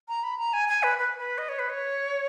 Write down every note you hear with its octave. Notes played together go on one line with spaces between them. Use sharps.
A#5
B5
A#5
G#5
G#5
B4
B4
B4
D#5
C#5
B4
C#5